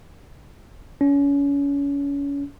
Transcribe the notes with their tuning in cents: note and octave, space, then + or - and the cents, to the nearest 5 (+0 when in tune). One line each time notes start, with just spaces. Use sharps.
C#4 +30